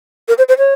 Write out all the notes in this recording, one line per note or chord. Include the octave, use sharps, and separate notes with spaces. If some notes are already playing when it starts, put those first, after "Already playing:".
A#4
C5
C5
C#5